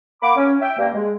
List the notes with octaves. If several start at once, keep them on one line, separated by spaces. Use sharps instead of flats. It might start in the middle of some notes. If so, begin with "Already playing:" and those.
A#3 F#5 B5 D6
C#4
E5 G5
G2 A#3
G#3